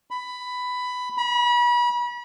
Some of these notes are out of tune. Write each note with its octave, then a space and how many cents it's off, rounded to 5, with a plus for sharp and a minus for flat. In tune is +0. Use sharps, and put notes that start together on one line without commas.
B5 +10
B5 -35